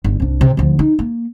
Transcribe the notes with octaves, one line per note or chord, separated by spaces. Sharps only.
G1
C2 D4
C3
D2 F3
D#4
A#3